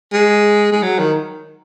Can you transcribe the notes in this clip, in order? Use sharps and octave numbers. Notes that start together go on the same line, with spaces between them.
G#3
G#3
F#3
D#3